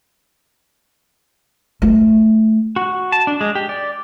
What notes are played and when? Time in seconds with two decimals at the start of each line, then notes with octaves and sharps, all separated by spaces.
1.82 A3 F4
2.76 F#4
3.12 A5
3.27 D4
3.41 G#3
3.55 G4
3.69 D5